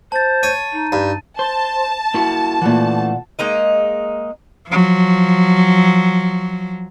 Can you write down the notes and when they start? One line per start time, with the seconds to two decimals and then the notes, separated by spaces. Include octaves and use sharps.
0.12 C5 A5 A6
0.43 C#5 D#7
0.72 D#4
0.92 G2
1.39 C5 A5
2.14 A#3 E4 F#4
2.62 A#2 E3 A3 F#5
3.39 G#3 A#3 D#4 D#5
4.67 F3 F#3